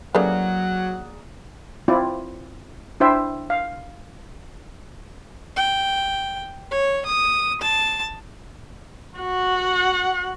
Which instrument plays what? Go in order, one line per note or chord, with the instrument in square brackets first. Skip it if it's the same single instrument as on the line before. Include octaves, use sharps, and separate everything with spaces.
[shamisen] C#3 E3 G3 [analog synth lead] F#3 [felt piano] A#3 G#4 D5 [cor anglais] F#5
[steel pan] C4 E4 F4 D5
D4 E4 C5 E5 G5
F5
[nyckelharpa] G5
C#5
D#6
A5
[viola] F#4 F#5